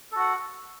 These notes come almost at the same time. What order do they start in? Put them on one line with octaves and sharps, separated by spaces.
A4 F#4 F#5